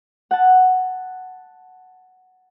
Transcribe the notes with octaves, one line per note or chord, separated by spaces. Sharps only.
F#5 A5